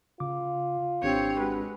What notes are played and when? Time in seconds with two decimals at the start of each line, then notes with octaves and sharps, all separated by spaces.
0.20 C#3 F4 D6
1.03 G#1 C4 D4 G4 C5 C#5
1.38 G#3 F#4 B4